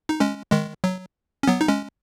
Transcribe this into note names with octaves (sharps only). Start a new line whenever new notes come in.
D#4
G#3 C#4
D#3 G#3
F#3
C#4
F#3 B3
D#4
G#3 C#4